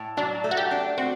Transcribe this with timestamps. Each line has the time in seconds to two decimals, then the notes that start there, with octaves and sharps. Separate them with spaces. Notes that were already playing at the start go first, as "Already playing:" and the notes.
Already playing: A2
0.17 F#3 D4
0.44 A3
0.51 F#4
0.57 G4
0.71 D4
0.97 C4 F#4